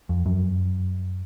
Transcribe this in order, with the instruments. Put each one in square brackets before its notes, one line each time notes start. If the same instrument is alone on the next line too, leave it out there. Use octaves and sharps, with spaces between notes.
[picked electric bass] F2
F#2